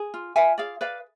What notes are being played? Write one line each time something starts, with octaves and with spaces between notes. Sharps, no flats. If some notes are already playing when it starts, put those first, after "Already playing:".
Already playing: G#4
F4
F4 E5 G#5
G#4 D5 F5
B4 D5 F5